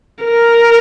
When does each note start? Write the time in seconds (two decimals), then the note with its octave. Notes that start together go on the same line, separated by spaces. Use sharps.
0.24 A#4